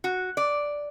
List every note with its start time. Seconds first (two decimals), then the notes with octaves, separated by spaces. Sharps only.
0.04 F#4
0.37 D5